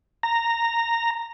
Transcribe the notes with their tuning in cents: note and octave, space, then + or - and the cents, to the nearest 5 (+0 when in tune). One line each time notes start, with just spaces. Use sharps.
A#5 -10